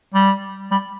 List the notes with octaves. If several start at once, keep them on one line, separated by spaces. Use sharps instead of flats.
G3
G3